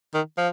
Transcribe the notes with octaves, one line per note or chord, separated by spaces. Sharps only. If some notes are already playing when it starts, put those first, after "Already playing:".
D#3
F3